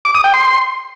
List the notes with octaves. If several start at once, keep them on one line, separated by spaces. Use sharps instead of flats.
D6
D#6
G5
C6